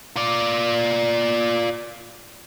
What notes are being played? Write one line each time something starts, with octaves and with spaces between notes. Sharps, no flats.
F4 D5